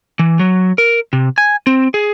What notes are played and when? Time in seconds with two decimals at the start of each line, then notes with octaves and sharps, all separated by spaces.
0.19 E3
0.39 F#3
0.78 A#4
1.13 C3
1.38 G#5
1.67 C4
1.94 G#4